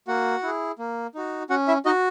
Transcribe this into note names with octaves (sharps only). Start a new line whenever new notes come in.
A#3 F#4 F#5
E4 G#4
A#3
D#4 F#4
C#4 F#4 F#5
E4 E5
D#4 F#4 D#5